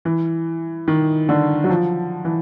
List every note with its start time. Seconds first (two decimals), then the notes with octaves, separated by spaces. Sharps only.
0.05 E3
0.88 D#3
1.29 D3
1.64 F#3
1.70 F3
2.25 E3